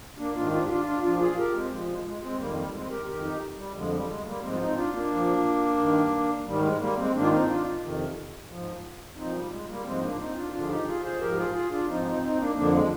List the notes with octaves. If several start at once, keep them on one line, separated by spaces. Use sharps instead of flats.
A#3 D4
G#2 D#3 D4 F4
D4 F4
G4
D4 F4
D4 F4
A#2 F3 D4 F4
F4 G#4
G4 A#4
G#3 C4
A#2 F3 G#3
G#3
G#3
G#3 C4
F2 D#3 G3 A#3
G3
G#3 C4
G4 A#4
F2 D#3 G4 A#4
D#4 G4
G3
F2 D3 F3 G#3
G3
G#3
G3 A#3
G#2 F3 G#3 C4
F4
C4 D#4
D4 F4
A#3 D4
A#2 F3
G2 D#3
G#2 D#3 G3
G#3
G3 A#3
G#3 C4
G#2 D#3 A#3 D4
F4
C4 D#4
D4 F4
F2 C3 D#3
G#2 F3
A#2 F3 C4 D#4
G3
G#3
G3 A#3
G#2 F3 G#3 C4
A#3 D4
C4 D#4
D4 F4
G2 D3 F3 D4 F4
G#4
D#4 G4
F4 G#4
G#4 C5
G#2 F3 G4 A#4
G4
F4 G#4
F4 G#4
D4 F4
G#2 F3 C4 D#4
C4 D#4
C4 D#4
A#3 D4
F2 D3 F3 A#3 D4
G#3